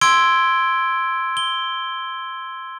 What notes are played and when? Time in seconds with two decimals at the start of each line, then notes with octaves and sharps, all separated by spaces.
0.01 C6 E6 G#6 D7 G7
1.37 G7